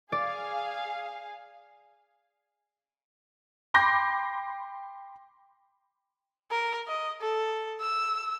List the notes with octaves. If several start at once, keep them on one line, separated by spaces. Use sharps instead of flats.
G#4 D5 F5 G#5
G5 B5 C6 D6 G6 A#6
A#4
D#5
A4
E6